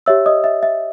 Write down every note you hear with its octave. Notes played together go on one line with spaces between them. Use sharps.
G4 C#5 E5 E6
D#5 D#6
E5
E5